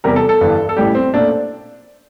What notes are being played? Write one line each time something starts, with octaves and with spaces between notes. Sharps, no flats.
E2 C3 G3 A#4
A4
A4
G1 G2 E3
A4
A1 A2 G3 G4
C4
A#2 A3 D4